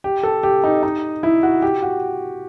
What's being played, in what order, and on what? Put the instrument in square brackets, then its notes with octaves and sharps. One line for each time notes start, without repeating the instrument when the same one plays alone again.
[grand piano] G4
A4
G4
D#4
D#4
E4
F#4
G4
F#4